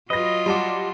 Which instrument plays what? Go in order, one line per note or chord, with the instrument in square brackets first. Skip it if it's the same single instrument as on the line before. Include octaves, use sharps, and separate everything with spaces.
[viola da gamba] F#3 F4 [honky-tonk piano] B4 A#6 [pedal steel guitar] D#5
[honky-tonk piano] G3 D6 [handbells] F#5 A5 C6